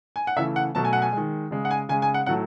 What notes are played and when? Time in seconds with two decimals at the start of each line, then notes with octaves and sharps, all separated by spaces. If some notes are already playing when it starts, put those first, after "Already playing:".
0.16 G#5
0.27 F#5
0.37 C#3 E3 A3 E5
0.56 F#5
0.75 B2 F#3 A3 A5
0.85 G#5
0.93 F#5
1.02 G#5
1.13 D#3 G#3
1.51 C#3 G#3
1.65 F#5
1.71 G#5
1.89 C#3 G#3 G#5
2.02 G#5
2.14 F#5
2.26 A2 F#3 A3 F#5